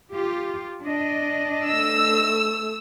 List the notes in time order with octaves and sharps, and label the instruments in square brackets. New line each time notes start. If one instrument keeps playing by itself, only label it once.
[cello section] F4 G4
D4 D#5
[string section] A3 E6